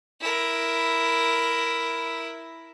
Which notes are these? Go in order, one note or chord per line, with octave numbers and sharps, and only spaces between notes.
E4 A#4